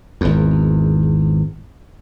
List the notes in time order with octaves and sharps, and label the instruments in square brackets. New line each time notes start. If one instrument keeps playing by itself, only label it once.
[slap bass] G#1 E2